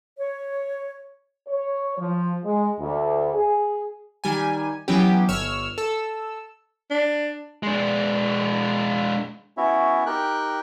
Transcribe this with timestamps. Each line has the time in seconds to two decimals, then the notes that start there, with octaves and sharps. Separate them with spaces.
0.19 C#5
1.47 C#5
1.98 F3
2.45 G#3
2.80 D2
3.33 G#4
4.24 D#3 G3 G#5
4.88 E3 F#3 B3 C#4 G4
5.29 G1 C#5 E6 F6
5.78 A4 E6
6.90 D4
7.63 G#3 D4
9.57 B3 C#4 E4 F#4 C#5 E5
10.06 D#4 G4 A#4 G5 F#6